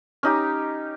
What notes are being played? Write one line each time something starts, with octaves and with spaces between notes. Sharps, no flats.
C#4 D#4 G4